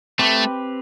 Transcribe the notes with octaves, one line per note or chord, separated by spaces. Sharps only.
A3 C4 G4 B4